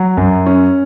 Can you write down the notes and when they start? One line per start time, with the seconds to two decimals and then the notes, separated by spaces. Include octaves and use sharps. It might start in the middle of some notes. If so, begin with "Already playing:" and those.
Already playing: F#3
0.17 F#2
0.46 C#4